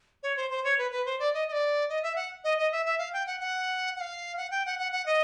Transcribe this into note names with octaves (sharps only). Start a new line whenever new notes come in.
C#5
C5
C5
C#5
B4
B4
C5
D5
D#5
D#5
D5
D#5
E5
F#5
D#5
D#5
E5
E5
F5
G5
F#5
F#5
F#5
F5
F#5
G5
F#5
F#5
F#5
D#5